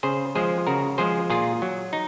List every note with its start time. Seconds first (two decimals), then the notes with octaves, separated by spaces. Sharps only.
0.03 C#3 G#4 C5
0.35 F3 G#3 G#4 C5
0.67 C#3 F#4 A#4
0.98 F3 G#3 G#4 C5
1.30 A#2 F4 G#4
1.62 F#3
1.93 D#4